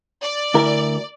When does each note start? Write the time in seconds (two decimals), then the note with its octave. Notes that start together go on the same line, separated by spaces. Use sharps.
0.21 D5
0.54 D2 E4 A#4